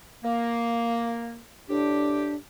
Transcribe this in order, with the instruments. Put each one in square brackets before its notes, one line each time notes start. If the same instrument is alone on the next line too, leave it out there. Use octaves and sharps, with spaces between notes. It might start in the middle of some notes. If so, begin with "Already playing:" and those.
[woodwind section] A#3
[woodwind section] A2 G4 [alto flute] D4